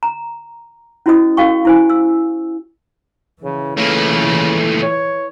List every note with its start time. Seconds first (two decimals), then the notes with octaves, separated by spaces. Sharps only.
0.03 A#5
1.06 C#4 E4 F#4 C5 D#5 D#6
1.37 C#4 F#4 A4 F5 G5 C#6
1.65 E4 C5 G#5
1.90 E6
3.44 C#3 E3
3.77 A#2 C#3 A3
4.82 C#5